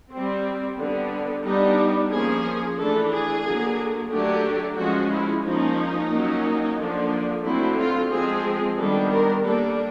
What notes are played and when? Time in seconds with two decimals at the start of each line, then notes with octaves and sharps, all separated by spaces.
0.12 G3 C4
0.78 D3 G3 B3 D4
1.44 G3 B3 D4 D#4
2.11 F3 A#3 C#4 G#4
2.78 E3 A3 D4 A4
3.11 G#4
3.44 D3 F#3 A#3
4.11 D3 F#3 A3 D4 G4
4.77 F3 G#3 C#4 F#4
5.11 E4
5.44 F3 A#3 C#4 D#4
6.11 F#3 A#3 C#4
6.77 D3 F3 A#3 D4
7.43 D3 F#3 A3 C4 E4
7.77 F4
8.10 F3 G#3 C4 G#4
8.77 D#3 G3 B3 D4 A4
9.10 A#4
9.43 G3 A#3 D4 A4